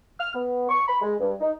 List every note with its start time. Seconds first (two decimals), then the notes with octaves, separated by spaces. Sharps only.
0.19 F6
0.34 B3
0.69 C#6
0.87 B5
1.02 G#3
1.20 G2
1.41 D#4